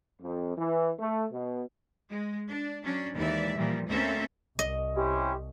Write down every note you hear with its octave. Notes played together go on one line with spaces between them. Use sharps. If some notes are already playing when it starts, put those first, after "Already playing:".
F2
E3
A3
B2
G#3
D4
F#3 C#4 D4
D#2 E3 G#3 D5 E5
A#2 E3 F3 G3
D2 A#3 C4 C#4 A4 E5
C2 D#5
C#4 E4 G4 C5